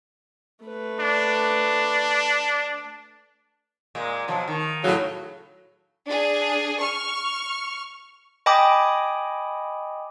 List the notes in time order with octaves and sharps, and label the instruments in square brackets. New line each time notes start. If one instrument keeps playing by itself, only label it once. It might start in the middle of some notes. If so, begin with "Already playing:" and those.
[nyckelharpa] A3 B4
[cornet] D4
[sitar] A#2 G#3
B2 F3 F#3
D#3
[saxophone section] A2 C#3 F#3
[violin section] D4 G#4
C#6 F6
[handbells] D#5 G5 G#5 B5 D6 D#6